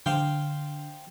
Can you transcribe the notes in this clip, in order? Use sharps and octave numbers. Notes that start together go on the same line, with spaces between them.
D3 C5 F5 G5